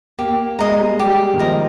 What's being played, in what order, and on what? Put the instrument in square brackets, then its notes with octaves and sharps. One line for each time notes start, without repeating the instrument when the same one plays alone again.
[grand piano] A#3 [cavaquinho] G4
[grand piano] G#3 [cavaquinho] A#4 D#5 A#5
[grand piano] G3
G#3
[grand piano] G3 [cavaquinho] G4
[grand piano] D#3
[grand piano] F3 [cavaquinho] A#4 D#5 A#5